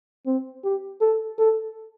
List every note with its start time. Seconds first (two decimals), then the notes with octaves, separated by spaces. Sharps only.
0.26 C4
0.64 G4
1.01 A4
1.38 A4